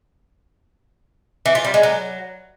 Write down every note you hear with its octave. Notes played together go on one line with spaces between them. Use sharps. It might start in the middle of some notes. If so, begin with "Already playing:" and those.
E3
F4
G3
G#3
F#3